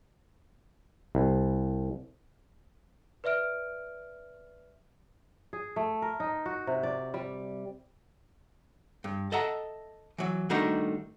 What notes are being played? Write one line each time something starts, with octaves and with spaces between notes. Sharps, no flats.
C2
B4 D5 E5 F6 D7
G#4
A3
A#4
D#4
F#4
C3
D5
G3
G2
A4 D#5 E5 F#5 A#5
E3 F#3
D#3 G3 A3 D4 D#4 F#4